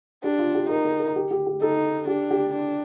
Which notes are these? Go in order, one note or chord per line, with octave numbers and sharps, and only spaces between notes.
D4 G4
F4
G4
D#4 A#4
A#4
A#4
G4
G4
G4
D#4 A4
D4 G4
G4
D4